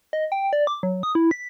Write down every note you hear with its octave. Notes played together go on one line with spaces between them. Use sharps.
D#5
G5
D5
D6
F#3
D#6
E4
B6